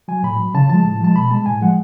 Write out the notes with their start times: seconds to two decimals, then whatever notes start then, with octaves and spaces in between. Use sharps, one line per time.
0.08 F#3 G#5
0.23 A2 B5
0.40 F#3
0.54 C#3 A5
0.69 F3 G#3 A5
0.84 A2
1.00 F3 G#3 A5
1.16 B2 B5
1.31 G#3 A5
1.46 A2 G#5
1.61 F3 G#3 F#5